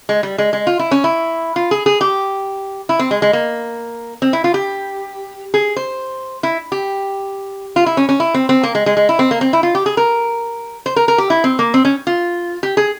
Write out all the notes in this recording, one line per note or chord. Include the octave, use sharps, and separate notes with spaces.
G#3
G3
G#3
G#3
F4
E4
C#4
E4
F4
G#4
G#4
G4
E4
C4
G#3
G#3
A#3
C4
E4
F4
G4
G#4
C5
E4
G4
F4
E4
C#4
C#4
E4
C4
C4
A#3
G#3
G#3
G#3
E4
C4
A#3
C4
E4
F4
G4
G#4
A#4
C5
A#4
A#4
G4
E4
C4
A#3
C4
C#4
F4
G4
G#4